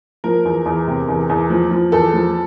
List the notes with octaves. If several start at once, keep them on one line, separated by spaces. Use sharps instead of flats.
F3 A#4
E2
E2
C3
E2
E2
F3
F3
E2 A4
F3